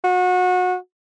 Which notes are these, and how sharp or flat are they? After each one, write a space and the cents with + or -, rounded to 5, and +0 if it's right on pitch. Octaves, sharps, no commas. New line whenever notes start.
F#4 -30